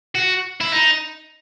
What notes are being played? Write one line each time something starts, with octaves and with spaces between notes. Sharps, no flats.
F#4
E4
D#4